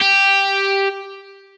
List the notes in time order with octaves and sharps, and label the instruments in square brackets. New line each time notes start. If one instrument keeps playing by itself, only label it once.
[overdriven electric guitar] G4